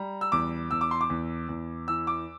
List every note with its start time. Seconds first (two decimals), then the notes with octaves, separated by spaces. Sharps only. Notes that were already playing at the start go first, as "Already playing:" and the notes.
Already playing: G3 A#5
0.21 E6
0.32 E2 D6
0.71 E2 E6
0.81 D6
0.91 C6
1.01 D6
1.10 E2
1.49 E2
1.88 E3 E6
2.07 D6